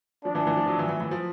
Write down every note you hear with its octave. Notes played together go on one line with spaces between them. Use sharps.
F3 D4
E3
E3
F3
F#3
E3
E3
E3
F3